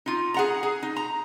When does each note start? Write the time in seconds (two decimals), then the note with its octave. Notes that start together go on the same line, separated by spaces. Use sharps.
0.06 D#4 F4
0.34 G#4 F#5 A#5
0.63 G#4
0.83 D#4
0.96 A#5